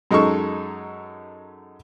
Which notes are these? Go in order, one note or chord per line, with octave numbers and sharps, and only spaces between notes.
F#2 G#3 D#4 A4 C#6